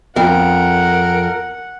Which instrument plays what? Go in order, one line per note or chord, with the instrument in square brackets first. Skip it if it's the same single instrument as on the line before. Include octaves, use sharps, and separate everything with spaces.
[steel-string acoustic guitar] F2 [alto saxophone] A#4 [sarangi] F#5